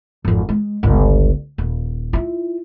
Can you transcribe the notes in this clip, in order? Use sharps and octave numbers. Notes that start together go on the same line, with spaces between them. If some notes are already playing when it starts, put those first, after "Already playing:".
G#1 F2
G#3
G1 C#2
D#1
E4 F4